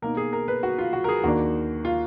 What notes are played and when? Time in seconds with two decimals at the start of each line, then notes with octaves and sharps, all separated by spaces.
0.02 B2 A#3 D#4 A#4
0.17 G#4
0.33 A#4
0.48 B4
0.63 F#4
0.78 F4
0.93 F#4
1.04 A#4
1.09 G#4
1.24 D#2 D#3 A#3 D4 F#4
1.85 F4